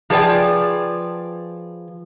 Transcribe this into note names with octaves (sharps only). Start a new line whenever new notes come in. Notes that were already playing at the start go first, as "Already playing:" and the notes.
F3 G#4 B4 D5 G5